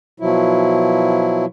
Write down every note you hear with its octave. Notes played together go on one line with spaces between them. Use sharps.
B2 F3 F#3 E4